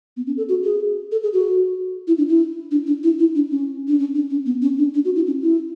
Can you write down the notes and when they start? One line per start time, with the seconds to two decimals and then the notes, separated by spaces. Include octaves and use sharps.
0.17 B3
0.27 C#4
0.37 A4
0.49 F#4
0.64 G#4
1.12 A4
1.23 G#4
1.33 F#4
2.08 E4
2.18 D4
2.29 E4
2.71 D4
2.87 D4
3.03 E4
3.19 E4
3.35 D4
3.51 C#4
3.88 D4
3.99 C#4
4.15 D4
4.30 C#4
4.46 B3
4.62 C#4
4.78 D4
4.94 D4
5.05 F#4
5.16 E4
5.27 C#4
5.42 E4